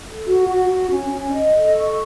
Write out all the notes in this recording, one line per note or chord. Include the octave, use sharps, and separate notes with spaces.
A4
F#4
F#4
F#4
C#4
C#4
D#5
A4
C#6